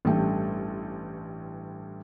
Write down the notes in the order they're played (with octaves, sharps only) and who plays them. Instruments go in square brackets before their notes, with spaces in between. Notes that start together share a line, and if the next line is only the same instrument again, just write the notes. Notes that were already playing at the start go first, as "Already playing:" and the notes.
[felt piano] A1 G2 G3 A3 G5